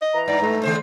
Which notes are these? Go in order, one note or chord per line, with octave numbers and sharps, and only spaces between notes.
D#5
E3 A#5
G2 D5
A3
D#2 C#3 C5